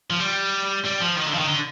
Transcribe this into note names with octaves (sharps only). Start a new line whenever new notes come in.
F3
G3
G3
F3
D#3
D3
F3
D#3
D3